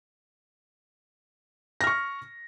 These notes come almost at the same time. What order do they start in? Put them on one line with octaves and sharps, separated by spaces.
A#6 F6 C#6